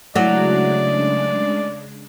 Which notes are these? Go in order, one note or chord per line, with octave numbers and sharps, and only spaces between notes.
C#3 F#3 G#3 A3 D4 E4 D5